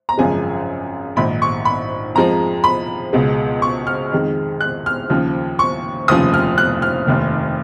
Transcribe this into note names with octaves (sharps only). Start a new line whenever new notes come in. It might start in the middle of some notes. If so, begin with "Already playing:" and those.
A#5
G#1 F#2 C#3 F3 G#3 G#5
A#1 G#2 D#3 B5
C#6
B5
F2 F3 G#3 A#5
B5
C#2 B2 G#3
C#6
F6
F2 D#3 G#3
F#6
F6
D#2 C#3 F3
C#6
F1 D#2 C#3 F3 D#6
F6
F#6
F6
F1 D#2 D#3